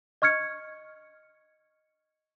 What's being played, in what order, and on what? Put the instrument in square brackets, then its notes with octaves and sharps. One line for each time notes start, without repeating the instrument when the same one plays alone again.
[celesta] D#5 C#6 F6 G#6 C#7